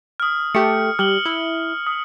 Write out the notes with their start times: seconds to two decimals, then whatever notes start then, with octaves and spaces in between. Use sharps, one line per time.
0.20 D#6 F6
0.55 A3 G4 C#7
0.99 G3 F6 F#7 G7
1.26 E4
1.87 D#6